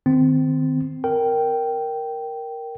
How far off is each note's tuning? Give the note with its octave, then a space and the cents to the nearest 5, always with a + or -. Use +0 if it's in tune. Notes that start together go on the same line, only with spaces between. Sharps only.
D#3 -15 C4 -20
A#4 +0 G5 -10